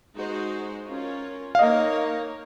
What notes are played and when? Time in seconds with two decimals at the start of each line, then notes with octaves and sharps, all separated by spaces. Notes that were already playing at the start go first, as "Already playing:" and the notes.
0.16 G#3 D#4 F#4 C5
0.88 C#4 F4 A#4 C#5
1.55 F5
1.59 A#3 D#4 A#4 C#5 D#5